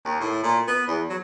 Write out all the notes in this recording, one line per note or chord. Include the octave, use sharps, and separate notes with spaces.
D#2
A2
A#2
B3
E2
F#3